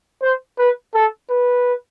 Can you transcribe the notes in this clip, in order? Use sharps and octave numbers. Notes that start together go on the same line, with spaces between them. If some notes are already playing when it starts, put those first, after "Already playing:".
C5
B4
A4
B4